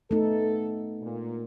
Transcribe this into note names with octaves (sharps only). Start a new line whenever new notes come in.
A3 B3 D#4 A4
A#2